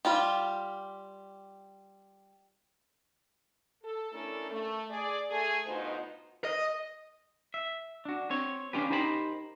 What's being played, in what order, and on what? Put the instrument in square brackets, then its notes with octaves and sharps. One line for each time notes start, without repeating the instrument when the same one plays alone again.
[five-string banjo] G3 F4 G4
[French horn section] A4
A3 C#4 D4 E4 A4 A#4
A3
G#4 D5
A3 G#4
D2 B2 D#4 F4 C5
[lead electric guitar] D#5
[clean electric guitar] E5
D4 F#4
C4 C#5
C#4 D4 F4 G4 B4
D#4 G4 A#4 C5 G#5 B5